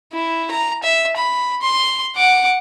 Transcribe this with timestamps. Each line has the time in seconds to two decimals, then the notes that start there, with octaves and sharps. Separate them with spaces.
0.13 E4
0.51 A#5
0.83 E5
1.17 B5
1.62 C6
2.16 F#5 D6